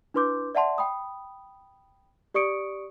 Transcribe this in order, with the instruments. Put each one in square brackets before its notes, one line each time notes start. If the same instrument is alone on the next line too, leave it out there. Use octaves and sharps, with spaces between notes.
[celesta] D4 E4 B4 C6 D6 G6
D5 E5 F#5 A5 C6
G5 B5 D#6
G4 D5 C#6 D#6 C#7 D7